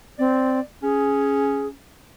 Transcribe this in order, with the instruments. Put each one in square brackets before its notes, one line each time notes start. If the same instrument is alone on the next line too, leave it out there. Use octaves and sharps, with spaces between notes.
[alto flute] C4 [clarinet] D5
[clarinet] C#4 [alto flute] G#4